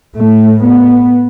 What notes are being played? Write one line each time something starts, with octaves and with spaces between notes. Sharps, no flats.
A2 A3
B3